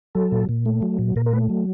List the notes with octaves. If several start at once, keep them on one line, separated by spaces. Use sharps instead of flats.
F#3 A4
A#2
A#2
A3
F#3
A#2
A#2 A#4
A#4
A3 B4
F#3